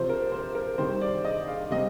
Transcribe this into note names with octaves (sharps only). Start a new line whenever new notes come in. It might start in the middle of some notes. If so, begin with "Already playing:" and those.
Already playing: C3 F3 C5
A#4
C5
A#4
C3 D#3 G3 C5
D5
D#5
F5
C3 G3 D#5